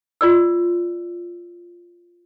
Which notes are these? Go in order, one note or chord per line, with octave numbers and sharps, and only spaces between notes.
F4 D5 E6